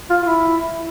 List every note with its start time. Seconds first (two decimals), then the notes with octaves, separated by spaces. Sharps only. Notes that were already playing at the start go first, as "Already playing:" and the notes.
0.10 F4
0.22 F4
0.27 E4